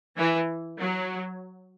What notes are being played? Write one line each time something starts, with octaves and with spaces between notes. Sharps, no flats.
E3
F#3